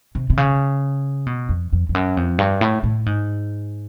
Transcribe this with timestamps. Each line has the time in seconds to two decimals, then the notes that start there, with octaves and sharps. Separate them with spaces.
0.15 C3
0.30 C3
0.37 C#3
1.27 B2
1.49 F2
1.72 F2
1.89 F2
1.95 F#2
2.17 F2
2.39 G2
2.61 A2
2.83 A2
3.06 G#2